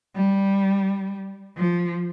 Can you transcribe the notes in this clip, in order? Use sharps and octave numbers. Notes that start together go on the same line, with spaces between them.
G3
F3